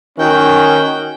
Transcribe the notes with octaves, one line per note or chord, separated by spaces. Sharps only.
D#3 C#4 F#4 G5